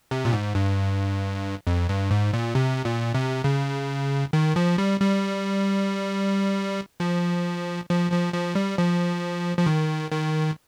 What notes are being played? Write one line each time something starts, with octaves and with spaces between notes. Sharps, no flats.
C3
A#2
G#2
G2
F2
G2
G#2
A#2
C3
A#2
C3
C#3
D#3
F3
G3
G3
F3
F3
F3
F3
G3
F3
F3
D#3
D#3